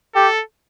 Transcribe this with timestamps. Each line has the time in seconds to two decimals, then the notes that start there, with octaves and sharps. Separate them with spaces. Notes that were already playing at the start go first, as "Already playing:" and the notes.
0.15 G4 A4